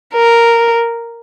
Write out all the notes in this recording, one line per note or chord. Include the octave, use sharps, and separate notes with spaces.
A#4